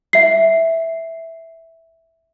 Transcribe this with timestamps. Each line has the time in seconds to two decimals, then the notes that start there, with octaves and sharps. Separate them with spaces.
0.13 E5 C7